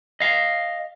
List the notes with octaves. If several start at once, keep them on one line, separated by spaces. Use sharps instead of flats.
D#5 F5